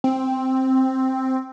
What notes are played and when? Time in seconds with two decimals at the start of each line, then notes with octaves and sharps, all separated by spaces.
0.04 C4